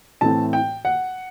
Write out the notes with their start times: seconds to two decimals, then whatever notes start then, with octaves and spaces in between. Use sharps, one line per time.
0.21 A2 E3 A3 C4 A5
0.53 G5
0.85 F#5